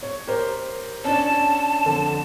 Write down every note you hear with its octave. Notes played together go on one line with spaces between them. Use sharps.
C#5
G4 A#4 C5
C#4 D4 A5
F2 D3